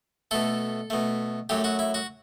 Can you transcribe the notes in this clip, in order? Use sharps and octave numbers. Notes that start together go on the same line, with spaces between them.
B2 A3 A4
B2 A3
F#2 F#3 A3 G4
F#4
E4
F#4